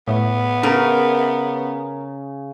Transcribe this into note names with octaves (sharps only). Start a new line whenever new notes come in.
A2 B3
C#3 A#4